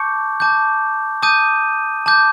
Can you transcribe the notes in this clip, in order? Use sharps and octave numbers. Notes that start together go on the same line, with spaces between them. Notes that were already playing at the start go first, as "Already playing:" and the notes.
Already playing: A5 C#6 D6 G6 C#7
A5 D6 G6
A5 D6 D#6 G6 D#7
A5 D6 G6